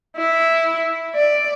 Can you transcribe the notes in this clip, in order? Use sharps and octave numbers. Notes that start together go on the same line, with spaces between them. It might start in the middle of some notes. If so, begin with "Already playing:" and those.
E4
D5